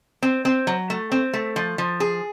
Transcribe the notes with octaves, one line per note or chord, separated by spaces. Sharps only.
C4
C4
F#3
A3
C4
A3
F3
F3
G#4